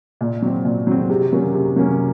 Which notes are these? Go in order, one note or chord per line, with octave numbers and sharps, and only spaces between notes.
A#2
F#3 C4
A#2
F#3 C4
C3
F#3 A#3 C#4
C3
F#3 A#3 C#4